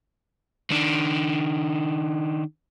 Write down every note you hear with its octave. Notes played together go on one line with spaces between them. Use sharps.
D#3 D4